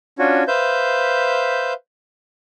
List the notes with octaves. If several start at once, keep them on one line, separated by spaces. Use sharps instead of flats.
C#4 D4 F4 F#4 C#5
B4 C5 E5 F5 G6